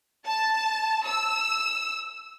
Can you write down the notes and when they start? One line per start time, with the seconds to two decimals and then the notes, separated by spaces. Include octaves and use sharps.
0.25 A5
1.06 E6